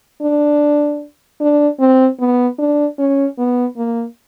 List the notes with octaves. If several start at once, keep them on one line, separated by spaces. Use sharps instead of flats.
D4
D4
C4
B3
D4
C#4
B3
A#3